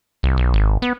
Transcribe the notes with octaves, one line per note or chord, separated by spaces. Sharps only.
C2
B1
G#1
B3